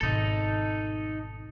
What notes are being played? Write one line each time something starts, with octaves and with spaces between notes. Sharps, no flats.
G#1 B2 D#4 A4